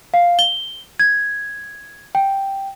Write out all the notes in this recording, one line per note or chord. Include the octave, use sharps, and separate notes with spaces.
F5
G7
G#6
G5